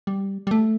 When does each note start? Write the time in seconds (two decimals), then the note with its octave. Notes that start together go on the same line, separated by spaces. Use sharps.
0.07 G3
0.47 G3
0.51 A3